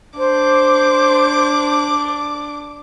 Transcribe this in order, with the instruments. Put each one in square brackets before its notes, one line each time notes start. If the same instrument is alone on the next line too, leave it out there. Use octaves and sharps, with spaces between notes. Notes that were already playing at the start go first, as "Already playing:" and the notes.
[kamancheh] D4 D6 [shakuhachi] C5